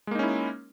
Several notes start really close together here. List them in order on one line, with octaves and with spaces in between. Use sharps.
G#3 A#3 D#4 C#4 E4